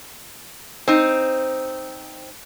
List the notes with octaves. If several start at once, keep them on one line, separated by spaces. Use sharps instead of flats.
C4 D#4